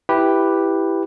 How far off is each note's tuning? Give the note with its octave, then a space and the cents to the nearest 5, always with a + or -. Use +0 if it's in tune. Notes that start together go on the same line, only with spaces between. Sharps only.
E4 +0 G4 +0 B4 +0